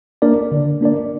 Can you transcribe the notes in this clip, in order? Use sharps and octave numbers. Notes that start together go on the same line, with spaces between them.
A#3 D4 A#4 D5
D3
A#3 D4 A#4 D5